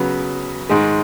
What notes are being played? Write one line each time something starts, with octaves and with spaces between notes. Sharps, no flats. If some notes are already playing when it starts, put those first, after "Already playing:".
Already playing: C#3 F#3 B3 F#4 B4
G#2 D#3 G#3